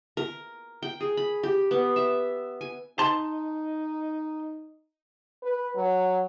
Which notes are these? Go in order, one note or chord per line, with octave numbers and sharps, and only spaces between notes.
A#4
G5
G#4
B5
G4
B3
E5
G#5
D#4 A5 C6
B4
F#3